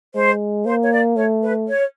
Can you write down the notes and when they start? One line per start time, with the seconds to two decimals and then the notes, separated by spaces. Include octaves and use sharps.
0.15 G#3 C5
0.66 A#3 C5
0.83 C#5
0.91 D5
1.16 A3 C#5
1.43 B4
1.68 C#5